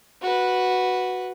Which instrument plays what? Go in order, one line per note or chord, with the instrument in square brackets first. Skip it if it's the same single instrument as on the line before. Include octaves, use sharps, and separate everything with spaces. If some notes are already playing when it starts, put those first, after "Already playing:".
[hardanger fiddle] F#4 B4